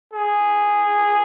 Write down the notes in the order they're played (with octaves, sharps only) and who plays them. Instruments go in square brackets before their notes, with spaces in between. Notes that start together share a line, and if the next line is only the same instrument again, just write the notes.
[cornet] G#4